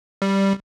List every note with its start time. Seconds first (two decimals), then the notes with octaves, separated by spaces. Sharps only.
0.22 G3